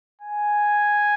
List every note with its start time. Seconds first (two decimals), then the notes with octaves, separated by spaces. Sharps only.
0.21 G#5